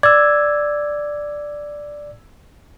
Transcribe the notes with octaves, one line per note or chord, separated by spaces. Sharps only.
D5 E6 G#6